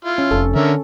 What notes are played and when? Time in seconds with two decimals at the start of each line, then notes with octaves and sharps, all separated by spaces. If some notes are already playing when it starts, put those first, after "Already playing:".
0.05 E4 F4
0.18 C#4
0.31 F1 A4
0.56 D3 C#4 A#4 E5